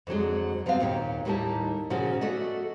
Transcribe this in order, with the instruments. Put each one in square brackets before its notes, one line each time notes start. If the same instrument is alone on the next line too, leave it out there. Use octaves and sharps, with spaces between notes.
[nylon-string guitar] F2 D3 F#3 G#3
F3 F#3 B3 C4 F5
D#2 A#2 G5
D#2 A2 G3 A#3 D#4 A5
A#2 C#3 F3 A#3 C#4 F#4
A3 F#4 A4 D5 D#5